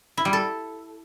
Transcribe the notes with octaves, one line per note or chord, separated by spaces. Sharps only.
E4
G3
A4